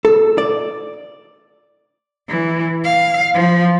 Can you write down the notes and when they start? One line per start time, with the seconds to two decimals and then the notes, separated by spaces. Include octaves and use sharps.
0.05 A4
0.38 D5
2.28 E3
2.84 F5
3.34 F3